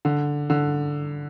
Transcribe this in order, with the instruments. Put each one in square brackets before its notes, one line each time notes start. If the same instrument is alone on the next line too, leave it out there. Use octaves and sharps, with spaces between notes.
[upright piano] D3
D3